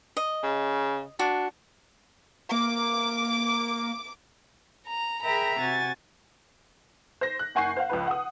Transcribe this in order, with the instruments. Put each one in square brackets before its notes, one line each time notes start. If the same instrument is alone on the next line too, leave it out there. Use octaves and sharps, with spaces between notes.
[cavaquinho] D#5
[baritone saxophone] C#3
[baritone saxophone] D4 [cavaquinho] F#4
[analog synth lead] A#3 [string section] D6
[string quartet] A#5
G#4 A#4 E5 G5 A#5 B5
C3 F#4 G#5 A6
[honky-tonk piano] C5 A#6
F#6
F#1 F#5 G#5 C#6 G6 C7
C5 F5 F#5
C#2 F3 B4
F#5 D#6